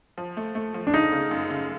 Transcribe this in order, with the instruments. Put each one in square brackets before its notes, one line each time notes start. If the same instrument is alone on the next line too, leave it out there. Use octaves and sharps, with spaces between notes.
[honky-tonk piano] F3
A3
A3
F3
[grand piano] D4
[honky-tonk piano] C#3 [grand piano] D#4
[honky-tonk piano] C#3
F#2
C#3